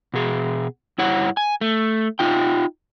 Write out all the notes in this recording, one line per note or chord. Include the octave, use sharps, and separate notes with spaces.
B2 G#4
G2 E4 C#5 F#5
G#5
A3
D#4 F4 G5